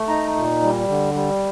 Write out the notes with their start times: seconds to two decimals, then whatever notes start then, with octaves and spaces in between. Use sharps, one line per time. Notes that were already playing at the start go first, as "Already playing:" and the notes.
Already playing: A3
0.08 D#4 A#5
0.35 A#2
0.62 G3
0.88 D3
1.14 G3